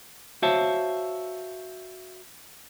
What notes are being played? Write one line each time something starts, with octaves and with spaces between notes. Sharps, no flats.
F#4 C5 C#5 E5 F5 A5